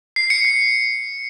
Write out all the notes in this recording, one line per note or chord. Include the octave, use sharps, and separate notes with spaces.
C7
C#7
C7